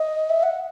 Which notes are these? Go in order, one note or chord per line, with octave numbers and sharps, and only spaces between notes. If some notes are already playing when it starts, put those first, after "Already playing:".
Already playing: D#5
E5
F#5